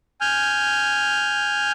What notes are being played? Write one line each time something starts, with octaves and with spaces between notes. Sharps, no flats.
G#5 F6 G6